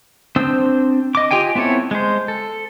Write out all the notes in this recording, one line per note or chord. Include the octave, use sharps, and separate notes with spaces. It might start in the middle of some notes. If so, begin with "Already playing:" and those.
C4 D4 C5 D#6 E6
D#5 D6
F4 G4 D#5 G5 G#5
B3 C4 E4 A4 C#5
G#3 C5
A4